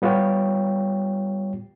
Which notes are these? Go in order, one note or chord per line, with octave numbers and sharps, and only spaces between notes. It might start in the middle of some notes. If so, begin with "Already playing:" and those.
G3 B3 F4 G4 C#5 G5